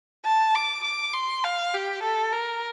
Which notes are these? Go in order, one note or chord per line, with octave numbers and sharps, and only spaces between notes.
A5
D6
D6
C6
F5
G4
A4
A#4